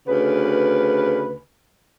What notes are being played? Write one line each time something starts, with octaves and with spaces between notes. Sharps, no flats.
D2 C#3 B4